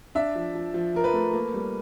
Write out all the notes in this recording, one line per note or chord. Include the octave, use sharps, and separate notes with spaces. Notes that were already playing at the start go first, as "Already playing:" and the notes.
D4 E5
F3
F3
F3
F3 A#4
B4
A3
A#3
G3